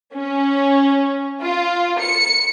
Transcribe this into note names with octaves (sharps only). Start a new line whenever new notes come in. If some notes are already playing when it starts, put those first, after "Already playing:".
C#4
F4
C#7